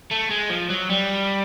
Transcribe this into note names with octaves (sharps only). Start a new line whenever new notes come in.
A3
G#3
F3
F#3
G3